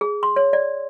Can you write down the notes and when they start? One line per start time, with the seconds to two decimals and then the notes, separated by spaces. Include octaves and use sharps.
0.01 G#4
0.23 C6
0.36 C#5
0.53 D5